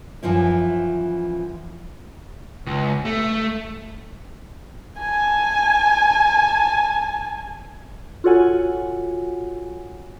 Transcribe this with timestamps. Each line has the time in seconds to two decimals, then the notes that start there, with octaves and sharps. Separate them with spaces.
0.23 F#2 E3 F3 E4
2.66 C#2
3.05 A3
4.99 G#5 A5
8.24 F4 F#4 A4 C#5 F#5 G#5